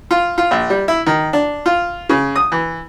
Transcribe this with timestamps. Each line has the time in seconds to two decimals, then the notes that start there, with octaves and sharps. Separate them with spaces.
0.11 F4
0.38 F4
0.51 A#1
0.70 G3
0.88 E4
1.06 D#3
1.33 D4
1.66 F4
2.09 C#3
2.36 D#6
2.52 E3